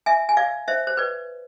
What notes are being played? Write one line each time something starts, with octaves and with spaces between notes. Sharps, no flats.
E5 G#5
G#5
D5 F5
C5 E5
C5
B4 D5